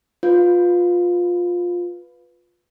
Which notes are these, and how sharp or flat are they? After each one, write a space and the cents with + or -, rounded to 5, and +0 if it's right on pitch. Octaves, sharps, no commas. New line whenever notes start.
F4 +15 B4 +0